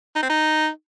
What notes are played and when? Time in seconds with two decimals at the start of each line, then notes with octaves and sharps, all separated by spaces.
0.16 D#4
0.23 C4
0.30 D#4